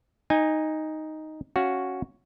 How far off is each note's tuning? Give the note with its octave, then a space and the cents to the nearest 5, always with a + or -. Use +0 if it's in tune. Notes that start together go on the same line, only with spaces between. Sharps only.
D#4 +0 G#5 -25
C#4 -5 F#4 +0 F5 +0